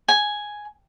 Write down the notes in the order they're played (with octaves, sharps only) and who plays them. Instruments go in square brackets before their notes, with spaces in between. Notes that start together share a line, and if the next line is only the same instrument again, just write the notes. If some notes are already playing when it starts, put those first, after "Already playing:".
[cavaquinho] G#5